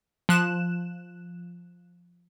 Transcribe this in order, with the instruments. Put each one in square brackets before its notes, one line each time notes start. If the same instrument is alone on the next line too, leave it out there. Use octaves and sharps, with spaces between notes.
[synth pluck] F3 F#6 E7